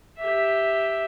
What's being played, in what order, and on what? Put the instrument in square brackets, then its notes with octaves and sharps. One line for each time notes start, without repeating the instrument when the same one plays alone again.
[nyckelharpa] G4 E5